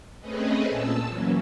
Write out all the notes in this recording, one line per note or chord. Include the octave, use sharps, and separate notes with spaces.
A3 C4 C#4 G#4 B4 D#5
A#2 A5 E6
E3 F#3 A#3 C#4